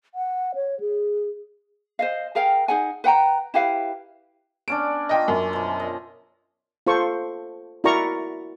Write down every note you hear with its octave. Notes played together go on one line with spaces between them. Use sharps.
F#5
C#5
G#4
C5 D#5 F5
G#4 A#4 F5 G5
D#4 G#4 F#5 G#5
B4 F#5 G5 A#5
E4 G4 B4 F5
B3 C#4 D4 D7
A#3 F4 D#5 G5
F#2
B2 F3
D#5
F4 A4 C5 C#6
E4 F#4 A#4 D5 A#5 C#6